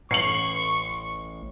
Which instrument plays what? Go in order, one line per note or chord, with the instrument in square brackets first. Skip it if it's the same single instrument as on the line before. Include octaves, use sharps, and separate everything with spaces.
[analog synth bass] A1 [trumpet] C#6 [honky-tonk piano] C7 C#7 F#7